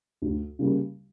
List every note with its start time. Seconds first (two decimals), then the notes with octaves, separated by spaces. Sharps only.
0.22 D2
0.59 C#3 G3 A#3